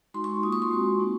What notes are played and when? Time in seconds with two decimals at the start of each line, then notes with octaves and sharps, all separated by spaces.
0.14 G#3 D#4 F#4 C6
0.24 C#6
0.43 A#3 F4 D#6
0.52 C#6
0.62 C6
0.71 G#3 C4 F#4
1.00 A#3 D#4 F#4